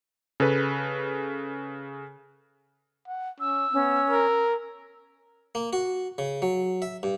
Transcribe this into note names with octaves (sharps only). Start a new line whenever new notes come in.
C#3 A4 B4
F#5
C#4 E6
B3 C#4
A#4
A#3
F#4
C#3
F#3
E5
G2